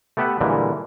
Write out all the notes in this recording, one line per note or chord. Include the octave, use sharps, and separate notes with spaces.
A3 B3 G4 B4 E5 F#5
A#2 D3 E3 G3 G#3